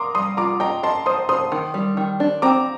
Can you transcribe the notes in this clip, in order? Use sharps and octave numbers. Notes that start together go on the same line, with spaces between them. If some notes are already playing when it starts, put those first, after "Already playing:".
Already playing: A#4 A#5 C6 D6 D#6
G3 C6 D#6
F4 A#5 D6
D#5 G5 A#5
D#5 A5 C6
C5 C6 D#6
C5 C6 D#6
D#3
G3
D#3
D4
C4 A#5 D6